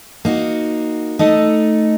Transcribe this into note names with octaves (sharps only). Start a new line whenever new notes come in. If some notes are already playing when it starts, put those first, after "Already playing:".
A#3 D#4 F#4
A3 D#4 A4 D#5